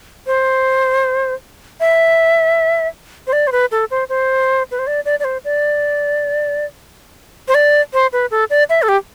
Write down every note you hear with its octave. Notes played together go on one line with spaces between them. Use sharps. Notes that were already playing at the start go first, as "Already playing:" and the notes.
C5
E5
C5
D5
C5
B4
A4
C5
C5
B4
C5
D5
D5
D5
C5
D5
C5
D5
C5
B4
A4
D5
E5
A4
G4